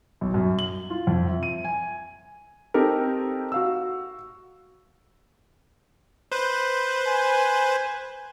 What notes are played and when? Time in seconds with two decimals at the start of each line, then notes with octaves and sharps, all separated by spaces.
0.21 B1
0.34 F#2
0.59 F#7
0.90 F4
1.07 F2
1.28 E5
1.43 D#7
1.65 G#5
2.74 C4 D#4 G4 A4 A#4
3.52 F#4 F5 E6
6.32 B4 C5
7.07 G#5